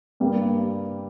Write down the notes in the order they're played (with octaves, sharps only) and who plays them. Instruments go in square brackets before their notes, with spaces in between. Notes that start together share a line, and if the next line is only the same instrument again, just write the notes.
[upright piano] G2 G3 A#3